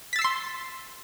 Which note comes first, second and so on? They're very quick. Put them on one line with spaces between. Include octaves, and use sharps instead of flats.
B6 A6 E6 C7 C6